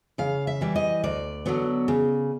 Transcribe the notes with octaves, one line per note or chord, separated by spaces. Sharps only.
C#3 F5
E5
E3 G3
D#5
D2 D5
D3 F#3 B3
C#3